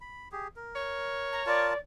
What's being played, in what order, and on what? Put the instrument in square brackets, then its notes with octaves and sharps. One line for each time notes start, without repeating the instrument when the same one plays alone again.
[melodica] B5
G4 G#4
A#4
[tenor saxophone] C#5
[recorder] A#5
[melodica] F4 A#4 A5 [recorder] D5